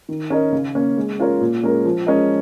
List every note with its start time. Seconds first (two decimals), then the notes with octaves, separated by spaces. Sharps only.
0.09 D#3
0.30 C#4 A#4 D#5
0.52 C#3
0.75 A#3 C#4
0.97 G#3
1.19 C#4 F4 A#4 C#5
1.41 A#2
1.63 G#3 C#4 A#4
1.85 F3
2.07 G#3 C#4 A#4 D#5